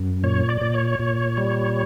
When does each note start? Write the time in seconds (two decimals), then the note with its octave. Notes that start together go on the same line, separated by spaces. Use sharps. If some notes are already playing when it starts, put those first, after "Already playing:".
Already playing: F#2
0.24 A#2 C#5
0.49 D5
0.62 A#2
0.74 C#5
0.99 A#2
1.38 G3